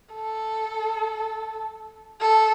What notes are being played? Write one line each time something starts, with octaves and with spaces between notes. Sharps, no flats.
A4
A4